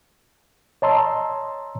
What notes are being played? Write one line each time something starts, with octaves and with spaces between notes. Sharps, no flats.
C#5 D#5 A5 A#5 C6 E6